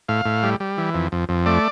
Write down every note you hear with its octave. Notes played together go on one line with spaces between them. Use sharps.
A2 F5
A2
G3
G3
E3
F2
F2
F2
A3 D5